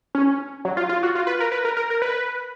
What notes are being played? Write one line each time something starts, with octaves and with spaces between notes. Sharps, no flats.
C#4
F#3
F4
F4
F#4
F4
B4
A#4
B4
A#4
A#4
A#4
B4